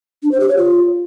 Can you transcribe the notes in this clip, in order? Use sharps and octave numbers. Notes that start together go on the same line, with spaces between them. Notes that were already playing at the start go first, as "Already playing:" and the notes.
D4
C5
G4
C#5
F4